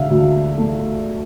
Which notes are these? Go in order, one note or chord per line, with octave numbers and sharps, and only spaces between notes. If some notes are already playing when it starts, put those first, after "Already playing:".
Already playing: D3 E5 F5
D2
A3